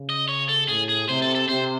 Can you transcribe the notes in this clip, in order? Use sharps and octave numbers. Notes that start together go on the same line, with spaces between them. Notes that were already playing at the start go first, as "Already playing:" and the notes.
Already playing: C#3
D#5
C#5
A4
A2 G#4
G#4
C3 C5
A4
A4
C3 C5